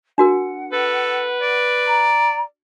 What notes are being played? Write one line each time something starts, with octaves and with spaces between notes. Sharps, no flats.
D4 F#4 A#4 F#5
A4 B4
D5
A#5